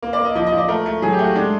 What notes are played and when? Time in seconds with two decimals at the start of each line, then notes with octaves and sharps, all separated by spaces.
0.03 A#3
0.13 D5
0.19 A#3
0.25 D#5
0.35 F3 D#5
0.47 D#5
0.52 F3
0.58 D5
0.68 A3 A#4
0.86 A3
1.02 F#3 G#4
1.13 G4
1.19 A3
1.24 F#4
1.35 G#3 D4